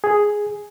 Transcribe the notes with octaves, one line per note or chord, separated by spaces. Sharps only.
G#4